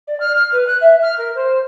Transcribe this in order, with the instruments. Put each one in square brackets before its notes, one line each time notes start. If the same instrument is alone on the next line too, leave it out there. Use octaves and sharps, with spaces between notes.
[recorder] D5
F6
F6
B4
F#6
E5
F6
A#4
C5